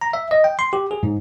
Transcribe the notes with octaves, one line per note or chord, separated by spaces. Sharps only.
A#5
E5
D#5
G5
C6
G4
G#4
G#2